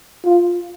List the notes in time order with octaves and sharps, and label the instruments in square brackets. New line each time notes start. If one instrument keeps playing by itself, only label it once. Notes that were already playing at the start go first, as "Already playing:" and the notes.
[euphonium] F4